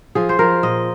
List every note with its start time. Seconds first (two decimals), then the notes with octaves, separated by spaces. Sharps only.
0.15 F3 G#4
0.29 C5
0.39 F3 A#4
0.63 A#2 D#5